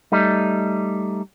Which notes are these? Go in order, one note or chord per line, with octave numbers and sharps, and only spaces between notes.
G3 A3 D#4